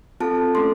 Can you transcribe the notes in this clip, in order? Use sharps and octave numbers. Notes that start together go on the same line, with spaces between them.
C4 F4 A4 A5
A3 C#4 A4 C6